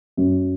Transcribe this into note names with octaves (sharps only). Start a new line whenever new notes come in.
F#2